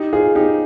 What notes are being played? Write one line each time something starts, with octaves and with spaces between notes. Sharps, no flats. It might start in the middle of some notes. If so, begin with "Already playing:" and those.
Already playing: D#4 G4
F4 G#4
D#4 G4